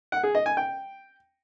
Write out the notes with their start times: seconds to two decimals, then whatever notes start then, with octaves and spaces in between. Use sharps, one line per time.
0.12 F#5
0.23 G#4
0.35 D#5
0.46 G#5
0.57 G5